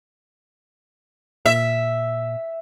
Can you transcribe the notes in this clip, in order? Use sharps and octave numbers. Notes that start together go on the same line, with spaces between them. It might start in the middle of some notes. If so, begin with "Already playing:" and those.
A#2 E5